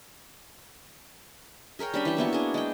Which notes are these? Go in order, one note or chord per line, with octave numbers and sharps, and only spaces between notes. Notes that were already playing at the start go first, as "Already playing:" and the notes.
G#4 A#4 C#5 G5
G3 C#4 D4 B5
E3 G5
A#3 B3 E4 F#4
D4 G#4
G#3 G5